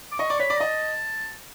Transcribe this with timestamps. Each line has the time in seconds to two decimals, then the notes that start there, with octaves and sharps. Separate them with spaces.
0.12 D6
0.19 D#5 C#6
0.30 D5
0.39 C#5 B5
0.50 D5
0.57 A#5
0.60 D#5 A5